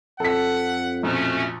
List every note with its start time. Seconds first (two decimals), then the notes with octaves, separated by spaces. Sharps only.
0.20 F2 A4 F#5 B6
1.03 A#1 B2 A3 C#4